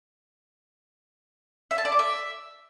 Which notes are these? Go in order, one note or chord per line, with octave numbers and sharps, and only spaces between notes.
E5
A5
D5
D6
E5